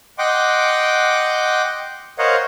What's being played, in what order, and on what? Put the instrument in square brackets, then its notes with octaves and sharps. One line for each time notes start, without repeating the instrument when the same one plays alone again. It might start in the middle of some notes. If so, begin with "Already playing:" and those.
[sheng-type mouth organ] D#5 F#5 G5 C6 D6
A#4 C5 C#5 D#5 F5 F#5